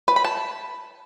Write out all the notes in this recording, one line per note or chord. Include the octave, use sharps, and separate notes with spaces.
B4
B5
A5